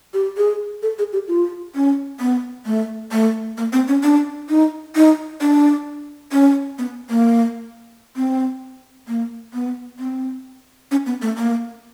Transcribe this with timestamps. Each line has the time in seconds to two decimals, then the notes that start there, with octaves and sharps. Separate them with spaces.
0.14 G4
0.37 G#4
0.82 A4
0.99 G#4
1.13 G4
1.28 F4
1.75 C#4
2.20 B3
2.66 A3
3.12 A3
3.57 A#3
3.73 C4
3.88 C#4
4.03 D4
4.49 D#4
4.95 D#4
5.41 D4
6.32 C#4
6.78 B3
7.10 A#3
8.16 C4
9.08 A#3
9.54 B3
9.99 C4
10.91 C#4
11.06 B3
11.22 A3
11.37 A#3